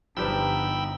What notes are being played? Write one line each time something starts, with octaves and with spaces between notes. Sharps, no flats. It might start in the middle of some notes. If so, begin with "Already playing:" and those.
G1 F3 G3 D#4 B4 G5 B5 E6